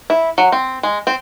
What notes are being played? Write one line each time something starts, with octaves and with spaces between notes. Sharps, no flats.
E4
F#3
C4
G#3
C4